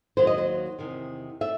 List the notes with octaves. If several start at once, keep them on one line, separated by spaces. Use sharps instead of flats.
D#2 D#3 F#3 C5
D#5
C5
E2 C3 D#3
A3 E5